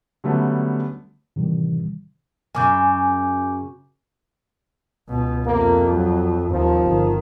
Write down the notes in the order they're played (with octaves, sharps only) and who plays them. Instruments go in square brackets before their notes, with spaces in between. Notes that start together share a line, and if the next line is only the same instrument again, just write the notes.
[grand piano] D3 F#3 G3 A3 B3 C#4
[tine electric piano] A2 C3 D#3 E3 G3
[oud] F#2 C#3 [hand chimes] G#5 D6 G6
[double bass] C#2 B2
[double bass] F2 [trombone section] C3 A#3
[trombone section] F#3
[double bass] D#2 [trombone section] C3 F3
[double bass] G1 D#3